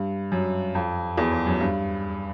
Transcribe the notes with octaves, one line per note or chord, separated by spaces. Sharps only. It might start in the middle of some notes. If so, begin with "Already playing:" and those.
Already playing: G2
F#2
F2
E2
F2
F#2
G2